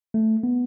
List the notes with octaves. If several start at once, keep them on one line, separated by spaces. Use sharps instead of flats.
A3
B3